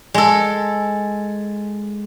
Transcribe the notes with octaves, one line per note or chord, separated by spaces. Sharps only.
G#3 A4